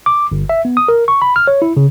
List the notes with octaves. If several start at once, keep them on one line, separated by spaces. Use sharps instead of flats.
D6
G1
E5
B3
D#6
A#4
C#6
B5
F6
C#5
E4
C#3